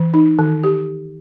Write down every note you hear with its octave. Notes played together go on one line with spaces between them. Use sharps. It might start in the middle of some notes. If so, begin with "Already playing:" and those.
Already playing: E3
D#4
D#3
G4